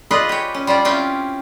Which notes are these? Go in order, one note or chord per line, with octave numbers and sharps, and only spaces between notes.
F4 G#4 B4 D5 D#5
G4 C#5
C#4
G3 F4 G4 D5
C4 C#4 E4 F4 G4 G5